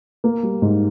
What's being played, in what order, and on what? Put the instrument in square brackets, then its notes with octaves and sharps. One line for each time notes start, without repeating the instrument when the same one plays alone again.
[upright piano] A#3
G3
G#2